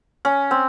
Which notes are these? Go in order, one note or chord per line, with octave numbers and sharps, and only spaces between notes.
C#4
C4